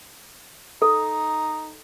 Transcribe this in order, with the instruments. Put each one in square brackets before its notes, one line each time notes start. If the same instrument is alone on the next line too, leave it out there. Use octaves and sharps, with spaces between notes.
[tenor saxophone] D#4 [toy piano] A4